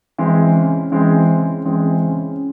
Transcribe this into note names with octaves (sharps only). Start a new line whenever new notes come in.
E3 G#3 C4
C#3
E3 G#3 C4
C#3
E3 G#3 C4
C#3